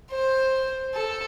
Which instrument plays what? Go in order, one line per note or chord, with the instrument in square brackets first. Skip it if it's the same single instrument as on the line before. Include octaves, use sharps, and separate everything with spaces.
[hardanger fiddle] C5
A4